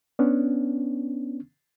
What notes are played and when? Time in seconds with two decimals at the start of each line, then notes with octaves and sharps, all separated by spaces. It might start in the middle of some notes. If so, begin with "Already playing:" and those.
0.19 B3 C#4 D4